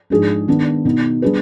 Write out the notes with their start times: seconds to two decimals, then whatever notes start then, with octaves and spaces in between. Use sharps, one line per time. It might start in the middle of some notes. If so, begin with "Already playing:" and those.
0.10 G#2 F3 G#3 D4 G#4
0.48 D#3 B3 D4
0.85 B2 B3 D#4
1.22 G3 B3 D4 G#4 B4